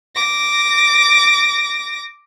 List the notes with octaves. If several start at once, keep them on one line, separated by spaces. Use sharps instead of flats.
D6 A#6